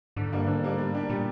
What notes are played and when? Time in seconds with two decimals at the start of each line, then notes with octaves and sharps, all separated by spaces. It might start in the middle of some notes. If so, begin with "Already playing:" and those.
0.16 G#2 D3
0.32 G2 G3 A#3 D4
0.47 G#2 D3
0.63 G3 A#3 D4
0.78 G3
0.94 A#3 D4 G4
1.09 A#2 G3